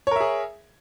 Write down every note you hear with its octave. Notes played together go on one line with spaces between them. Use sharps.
G#4 A#4 C#5 E5